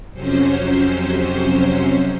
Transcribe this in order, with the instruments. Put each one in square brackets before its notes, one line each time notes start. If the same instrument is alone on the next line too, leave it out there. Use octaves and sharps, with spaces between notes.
[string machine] F2 C3 F#3 C#4 C5